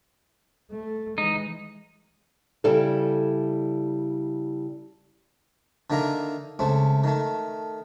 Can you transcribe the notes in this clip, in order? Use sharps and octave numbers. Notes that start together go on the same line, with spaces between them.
A3
E3 G#3 D#4
C#3 G3 E4 A4
D3 D#3 A#3 E5 A#5
C#2 A3 C4
D#3 A3